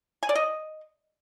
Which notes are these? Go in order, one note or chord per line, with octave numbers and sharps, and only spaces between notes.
G#5
D5
D#5